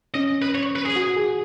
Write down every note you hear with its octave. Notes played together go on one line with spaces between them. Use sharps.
C#4 D#5
B4
C#5
B4
G#4
F#4
G#4